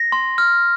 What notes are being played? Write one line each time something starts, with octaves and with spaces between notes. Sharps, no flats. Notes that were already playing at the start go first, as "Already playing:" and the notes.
Already playing: A#6
C6
F6